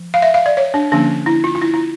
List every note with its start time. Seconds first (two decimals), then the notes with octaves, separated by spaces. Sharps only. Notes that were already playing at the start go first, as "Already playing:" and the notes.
Already playing: F3
0.14 F5
0.22 E5
0.34 F5
0.46 D5
0.57 C#5
0.74 D4
0.92 D3 F3 A#3 C#4 D4
1.26 E4
1.44 F4
1.55 F4
1.61 E4
1.74 E4